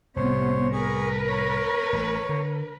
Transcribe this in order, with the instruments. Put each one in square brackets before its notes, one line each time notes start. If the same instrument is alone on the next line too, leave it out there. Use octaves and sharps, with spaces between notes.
[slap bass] C2 A2 [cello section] C3 B3 [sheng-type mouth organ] C5 C#5
[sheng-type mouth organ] G#4 C#6 [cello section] A#4 B4
[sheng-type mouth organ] C#5
[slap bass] A1
D3